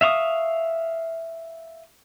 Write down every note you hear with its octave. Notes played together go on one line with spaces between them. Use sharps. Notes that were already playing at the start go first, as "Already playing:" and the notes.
E5 F5 C#6 D#6